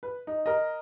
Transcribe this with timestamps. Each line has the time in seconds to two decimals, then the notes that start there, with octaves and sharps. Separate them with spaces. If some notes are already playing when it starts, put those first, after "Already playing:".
0.03 B4
0.27 D#4
0.46 A#4 D#5